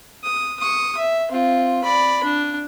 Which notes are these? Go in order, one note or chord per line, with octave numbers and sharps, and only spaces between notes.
D#6
C#6 D#6
E5
C4 F4
D5 B5
D4